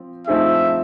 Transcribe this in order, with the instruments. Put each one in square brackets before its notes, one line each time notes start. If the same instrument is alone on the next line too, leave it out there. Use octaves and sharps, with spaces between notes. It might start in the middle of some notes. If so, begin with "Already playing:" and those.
Already playing: [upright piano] F3 C4
[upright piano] F3 A3 C4 D#4 G#4 [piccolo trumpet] E5